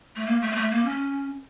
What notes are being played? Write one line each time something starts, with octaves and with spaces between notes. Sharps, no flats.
A3
A#3
A3
A#3
A3
A#3
C#4